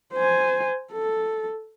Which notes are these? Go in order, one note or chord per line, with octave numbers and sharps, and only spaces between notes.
C5 G#5
A4